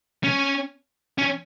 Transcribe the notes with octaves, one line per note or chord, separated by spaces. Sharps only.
C#4
C#4